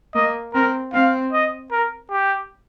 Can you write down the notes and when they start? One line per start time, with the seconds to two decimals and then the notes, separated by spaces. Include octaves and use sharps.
0.14 A#3 D#5
0.54 C4 A#4
0.93 C4 F5
1.33 D#5
1.71 A#4
2.11 G4